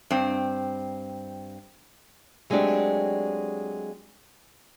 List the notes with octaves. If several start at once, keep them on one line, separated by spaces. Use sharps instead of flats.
G2 C4
F#3 G#3 A3 C4 D4 G4